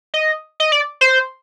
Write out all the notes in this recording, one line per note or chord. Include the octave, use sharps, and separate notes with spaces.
D#5
D#5
D5
C5